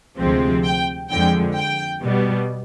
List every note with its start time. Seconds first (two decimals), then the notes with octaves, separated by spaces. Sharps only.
0.19 D2 C3 F3 G#3 C4
0.65 G5
1.11 F2 D3 F3 G#3 G5
1.56 G5
2.02 B2 G3 B3